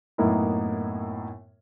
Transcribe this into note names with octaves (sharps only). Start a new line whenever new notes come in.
F#2 A2 A#3 B3 D#4 E4